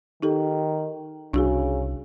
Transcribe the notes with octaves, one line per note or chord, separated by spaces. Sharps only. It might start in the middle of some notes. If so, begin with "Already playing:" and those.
D#3 D#4 G4 A4
C2 C#3 D4 F#4 G#4